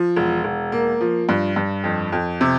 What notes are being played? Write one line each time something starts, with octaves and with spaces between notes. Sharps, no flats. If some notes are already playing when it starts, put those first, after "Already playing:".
Already playing: F3
E1
E1
A#3
F3
G2
G2
F2
F2
C3